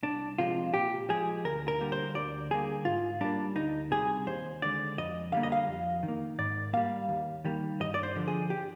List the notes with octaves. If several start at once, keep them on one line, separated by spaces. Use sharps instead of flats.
C2 D4
C3 F3 G#3 F4
A#2 G4
F3 G#3 G#4
D2 A#4
A#4
D3 G3 A#3
C5
D2 D5
D3 G3 A#3 G#4
G#2 F4
G3 A#3 D4
D2 D#4
C3 G3 G#4
D#2 C5
D3 G#3 D5
F2 D#5
D3 G3 A#3 F5
D#5
F5
F2
D#3
A#3
G#2 D5
G3 A#3 F5
D#2
D#3 G3 A#3
G2 D#5
D5
C5
D3 F3
G#4
G4